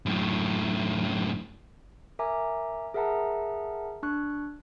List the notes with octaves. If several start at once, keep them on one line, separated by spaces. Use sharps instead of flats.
F#2 A2
A#4 E5 G#5 A#5 D6
G#4 A#4 E5 F#5 A5 A#5
D4 C#6 F#6